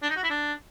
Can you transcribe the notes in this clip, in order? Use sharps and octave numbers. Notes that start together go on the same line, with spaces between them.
D4
D#4
F#4
E4
D4